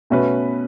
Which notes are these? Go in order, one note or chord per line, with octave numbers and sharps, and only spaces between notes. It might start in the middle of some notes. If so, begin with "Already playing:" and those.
B2 A3 C#4 F#4 B4